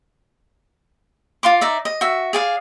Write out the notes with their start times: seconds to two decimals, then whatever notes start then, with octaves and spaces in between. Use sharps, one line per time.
1.43 F4 F5 C6 D6
1.61 D#4 D5 E5
1.85 D#5
2.01 F#4 E5
2.33 G#4 D5 F5